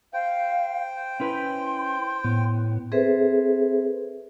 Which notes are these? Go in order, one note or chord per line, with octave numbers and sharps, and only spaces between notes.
C5 F5 G5
C#4 E4 B4 C6
A2 B3
C4 G#4 A4 B4 C5 E5